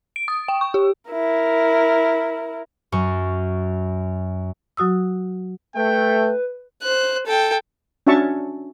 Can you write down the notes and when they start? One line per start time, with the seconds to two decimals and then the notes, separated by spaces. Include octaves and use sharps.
0.16 D7
0.28 D#6
0.48 G5
0.61 C#6
0.74 G4
1.11 E4 A#4
2.92 F#2 C#6
4.77 F#3 F#4 D#6 E6
5.76 A3 B4 G5
6.83 C5 F#6
7.26 A4 G5
8.07 C#4 D4 F#4 E5 A5 C#6